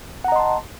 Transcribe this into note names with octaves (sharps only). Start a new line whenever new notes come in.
D#5 F#5 A5 A#5 C6